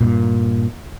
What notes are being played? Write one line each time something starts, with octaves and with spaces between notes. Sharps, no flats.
G2 A#2